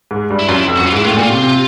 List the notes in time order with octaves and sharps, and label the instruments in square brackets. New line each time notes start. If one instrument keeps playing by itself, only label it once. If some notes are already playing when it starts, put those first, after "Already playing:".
[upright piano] G#2
G2
[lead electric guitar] E4
[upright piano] F#2 [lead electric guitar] F4
[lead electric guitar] E4
[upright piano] F2
[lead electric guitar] F#4
[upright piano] F#2
[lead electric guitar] F4
[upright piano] G#2 [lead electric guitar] E4
[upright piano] A2 [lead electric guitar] F4
[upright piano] A#2 [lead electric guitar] F#4
[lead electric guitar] F4
[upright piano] C3
C3